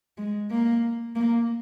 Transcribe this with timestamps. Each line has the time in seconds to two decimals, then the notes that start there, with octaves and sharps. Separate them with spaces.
0.18 G#3
0.51 A#3
1.16 A#3